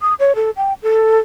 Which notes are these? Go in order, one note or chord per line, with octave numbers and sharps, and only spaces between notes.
D#6
C#5
A4
G5
A4